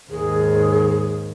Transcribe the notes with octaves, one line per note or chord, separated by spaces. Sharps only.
D#2 G#2 G#4